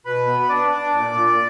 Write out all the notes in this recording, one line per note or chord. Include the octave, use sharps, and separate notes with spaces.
B2 B4 B5
B3
B5
D4 D5 D6
D4
A#2
A#2